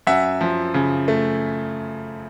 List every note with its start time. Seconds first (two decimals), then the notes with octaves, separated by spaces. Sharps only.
0.07 F#2 E5 F#5
0.41 F3
0.74 C#3
1.08 A3